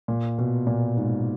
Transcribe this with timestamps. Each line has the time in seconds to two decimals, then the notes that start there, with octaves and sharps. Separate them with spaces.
0.08 A#2
0.38 B2
0.67 A#2
0.97 G#2